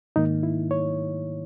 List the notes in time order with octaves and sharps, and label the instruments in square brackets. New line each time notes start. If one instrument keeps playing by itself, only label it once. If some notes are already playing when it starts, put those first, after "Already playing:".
[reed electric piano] G#2 D#3 A#3 D#4
E4
C#5